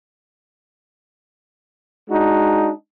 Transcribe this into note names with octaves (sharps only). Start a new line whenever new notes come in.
G#3 D4 D#4 F#4